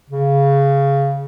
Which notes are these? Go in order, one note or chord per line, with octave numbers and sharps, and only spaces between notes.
C#3